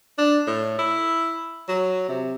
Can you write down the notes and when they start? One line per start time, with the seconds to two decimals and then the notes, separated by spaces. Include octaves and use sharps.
0.18 D4
0.47 A2
0.79 E4
1.69 F#3
2.09 C3